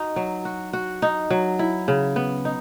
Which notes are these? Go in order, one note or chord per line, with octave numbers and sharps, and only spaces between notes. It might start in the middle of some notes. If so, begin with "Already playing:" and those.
Already playing: D#4 F#4
F#3
F#4
F#4
D#4
F#3
E4
C#3
B3
D#4